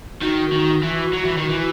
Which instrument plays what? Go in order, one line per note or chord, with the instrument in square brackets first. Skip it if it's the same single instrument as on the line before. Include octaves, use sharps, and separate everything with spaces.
[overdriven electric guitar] D#3 [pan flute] F#4
[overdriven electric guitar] D#3
E3
F#3
E3
D#3
E3